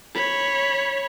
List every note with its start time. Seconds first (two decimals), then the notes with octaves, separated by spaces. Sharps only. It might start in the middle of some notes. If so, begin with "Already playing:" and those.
0.14 C#5 B5